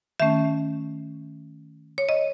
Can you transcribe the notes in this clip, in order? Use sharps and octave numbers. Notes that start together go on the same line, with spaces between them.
D#3 A3 C#4 E5
C#5
D#5